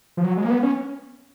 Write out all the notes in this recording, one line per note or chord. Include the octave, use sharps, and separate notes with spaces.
F3
F#3
G#3
A#3
B3
C#4